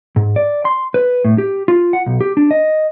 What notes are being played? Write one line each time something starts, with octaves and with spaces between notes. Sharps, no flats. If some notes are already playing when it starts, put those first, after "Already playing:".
G#2
D5
C6
B4
A2
G4
F4
F#5
B1
G4
D4
D#5